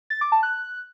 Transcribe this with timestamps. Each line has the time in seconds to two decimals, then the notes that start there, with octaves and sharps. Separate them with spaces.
0.10 A6
0.21 D6
0.32 A5
0.43 F#6